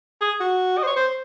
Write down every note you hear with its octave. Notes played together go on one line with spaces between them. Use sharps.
G#4
F#4
D#5
C5
C#5
C5